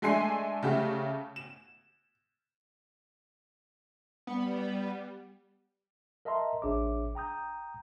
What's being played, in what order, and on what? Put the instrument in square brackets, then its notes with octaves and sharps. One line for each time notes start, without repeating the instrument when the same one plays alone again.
[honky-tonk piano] G#3 A3 D4 G#5 C6 C7
C#3 G3 A3 G4
E7
[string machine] G3 [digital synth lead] B3
[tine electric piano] A#4 D#5 E5 A5 A#5 C6
A1 D4 G#4 C#5 E5 D6
G5 A#5 D#6 G6